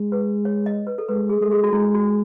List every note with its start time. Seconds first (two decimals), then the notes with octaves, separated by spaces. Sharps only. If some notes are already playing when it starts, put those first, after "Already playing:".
Already playing: G#3
0.12 B4
0.45 C#5
0.66 D#5
0.87 B4
0.98 A4
1.08 G#3 B4
1.29 G#4
1.41 G#3 A4
1.51 G#4
1.63 F#4
1.73 G#3 E4
1.94 F#4